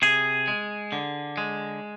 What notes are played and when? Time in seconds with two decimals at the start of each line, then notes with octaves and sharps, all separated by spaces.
0.02 C3 G#4
0.48 G#3
0.92 D3
1.38 G#3